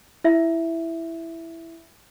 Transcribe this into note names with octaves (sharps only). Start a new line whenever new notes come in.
E4 E5